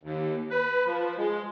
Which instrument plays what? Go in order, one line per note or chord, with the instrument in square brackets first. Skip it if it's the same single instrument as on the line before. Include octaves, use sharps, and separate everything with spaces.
[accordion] D#2
B4
F3
G#3